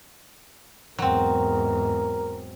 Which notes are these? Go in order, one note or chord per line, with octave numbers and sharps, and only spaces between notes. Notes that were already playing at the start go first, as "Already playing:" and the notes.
E2 G#2 F#3 C4 A#4